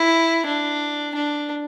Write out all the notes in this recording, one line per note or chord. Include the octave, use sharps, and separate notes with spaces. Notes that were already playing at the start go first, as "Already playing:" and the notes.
Already playing: E4
D4
D4